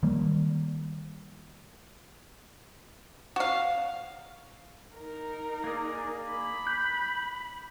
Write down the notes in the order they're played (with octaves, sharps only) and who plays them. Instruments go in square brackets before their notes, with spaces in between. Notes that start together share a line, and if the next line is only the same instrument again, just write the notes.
[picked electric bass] D#3 G3 A#3
[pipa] F#4 F5
[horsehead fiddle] D#4 A#4
[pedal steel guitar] A#3 D4 G#4
[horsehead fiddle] B5
[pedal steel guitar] F#6 G6